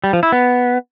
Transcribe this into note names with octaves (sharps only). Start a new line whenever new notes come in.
G3
F3
E4
B3